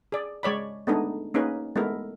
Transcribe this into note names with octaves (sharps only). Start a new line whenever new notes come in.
G#4 D5
G#3 C#5 D5 B5
G#3 A3 B3 D4 D#4 G#4
A#3 C#4 D#4 G#4 B4
G#3 A3 B3 E4 A#4